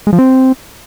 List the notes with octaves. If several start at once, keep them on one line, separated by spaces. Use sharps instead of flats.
G#3
F3
C4